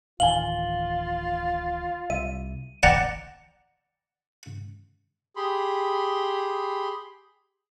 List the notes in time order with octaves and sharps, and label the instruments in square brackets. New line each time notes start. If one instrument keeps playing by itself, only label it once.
[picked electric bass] D1 A1 D#3 [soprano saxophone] F4 [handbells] F5 G#5 [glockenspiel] F#7 G7
[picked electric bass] C2 [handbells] E5 [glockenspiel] D#7
[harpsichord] D5 F#5 G5 A5 A#5
[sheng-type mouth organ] G4 G#4 B5 C6